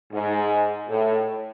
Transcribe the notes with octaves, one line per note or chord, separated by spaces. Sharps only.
G#2
A2